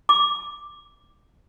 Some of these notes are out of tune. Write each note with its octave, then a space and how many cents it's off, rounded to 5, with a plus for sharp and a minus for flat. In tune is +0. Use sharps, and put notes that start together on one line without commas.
D6 +0